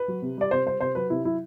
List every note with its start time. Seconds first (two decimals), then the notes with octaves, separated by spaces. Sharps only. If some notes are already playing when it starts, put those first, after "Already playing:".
Already playing: B4
0.08 F#3
0.22 C3
0.37 G3 D5
0.51 C3 C5
0.66 G3 C5
0.80 C3 C5
0.95 F#3 B4
1.10 C3 E4
1.25 F#3 E4